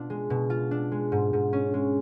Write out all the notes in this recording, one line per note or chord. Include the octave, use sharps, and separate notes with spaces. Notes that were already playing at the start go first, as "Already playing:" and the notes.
Already playing: B2 D4 F4
G#3
B2
F4
D4
G#3
G#2
G#2
C#4
G#3